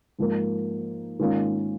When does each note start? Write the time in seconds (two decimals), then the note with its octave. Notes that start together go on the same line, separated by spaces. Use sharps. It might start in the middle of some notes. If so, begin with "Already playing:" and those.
0.19 G#2 F3 A#3
1.19 G#2 D#3 A#3 C#4 F4